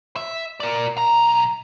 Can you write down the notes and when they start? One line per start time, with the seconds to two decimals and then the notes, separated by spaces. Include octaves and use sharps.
0.16 E5
0.60 A#4 D5
0.98 B1 A#5